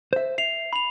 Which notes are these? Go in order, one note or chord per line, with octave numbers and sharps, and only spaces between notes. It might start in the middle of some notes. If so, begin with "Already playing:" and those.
C5 E5
E5 C7 F7
B5 F7